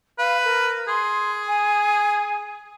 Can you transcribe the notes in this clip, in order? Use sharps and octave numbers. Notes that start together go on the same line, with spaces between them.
B4 F5
A#4
G#4 C6
G#5